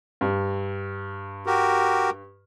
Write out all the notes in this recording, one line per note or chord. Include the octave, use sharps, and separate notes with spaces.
G2
F#4 G4 A#4